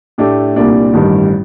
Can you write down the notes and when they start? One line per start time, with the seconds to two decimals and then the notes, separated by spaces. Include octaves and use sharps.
0.18 A2 A3 D4 G4
0.56 C2 A#2 G3 A#3 D4
0.93 A1 G2 D#3 G3